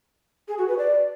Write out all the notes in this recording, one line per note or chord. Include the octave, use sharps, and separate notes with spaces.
G#4
F#4
B4
D5